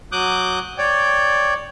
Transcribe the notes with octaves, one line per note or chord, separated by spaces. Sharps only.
F#3 D6 D#6 F#6 G6
C#5 D5 G5